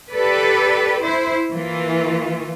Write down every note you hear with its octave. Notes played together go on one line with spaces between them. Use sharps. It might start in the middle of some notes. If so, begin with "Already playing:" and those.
G4 A4 B4 D5
E4 C5
E3 A#3 F4